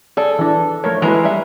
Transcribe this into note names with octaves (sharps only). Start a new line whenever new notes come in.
G#4 A4 D5
E3 D4
F3 A3 A#4 C#5
E3 G#3 A#3 E4 F#4 B4 A#5
G3 E5 F#5